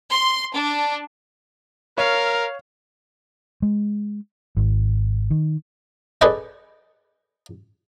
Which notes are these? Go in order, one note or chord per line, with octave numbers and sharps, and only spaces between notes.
C6
D4
A#4 C#5 F5
G#3
G#1
D#3
G#4 A4 B4 D5 D#5 G5